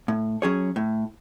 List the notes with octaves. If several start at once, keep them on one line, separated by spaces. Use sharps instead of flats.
A2
F#3 C#4 G#4 C#5
A2